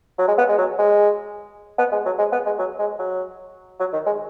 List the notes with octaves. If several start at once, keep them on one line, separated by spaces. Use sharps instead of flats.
F#3
G#3
B3
G#3
F#3
G#3
B3
G#3
F#3
G#3
B3
G#3
F#3
G#3
F#3
F#3
D#3
G#3